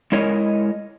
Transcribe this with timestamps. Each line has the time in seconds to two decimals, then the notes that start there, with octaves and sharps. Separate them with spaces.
0.12 G#3 E4 A#4 C#5 D#5